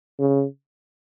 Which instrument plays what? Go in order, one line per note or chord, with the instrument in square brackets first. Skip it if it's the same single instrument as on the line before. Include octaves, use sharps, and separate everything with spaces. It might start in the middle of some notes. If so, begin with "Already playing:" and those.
[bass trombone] C#3